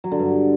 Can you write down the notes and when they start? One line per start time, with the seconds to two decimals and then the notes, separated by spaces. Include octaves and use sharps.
0.04 F#3
0.12 D3
0.19 G2